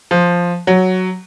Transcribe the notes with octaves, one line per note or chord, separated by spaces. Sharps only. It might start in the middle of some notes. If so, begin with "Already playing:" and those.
F3
F#3